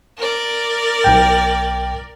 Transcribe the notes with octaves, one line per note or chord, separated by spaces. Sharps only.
A#4 D5
B1 G5